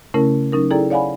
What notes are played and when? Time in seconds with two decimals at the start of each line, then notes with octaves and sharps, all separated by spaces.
0.14 C#3 A3 C#4 E4 A#4
0.52 F#3 C#4 D#4 A#4
0.71 E4 G#4 A4 D5 G5 A#5
0.90 C#5 D5 F5 F#5 G#5 B5